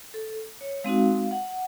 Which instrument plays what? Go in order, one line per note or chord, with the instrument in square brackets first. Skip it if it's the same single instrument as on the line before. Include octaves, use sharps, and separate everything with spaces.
[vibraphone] A4
C#5
G#3 C4 D#4 F#4 F5
F#5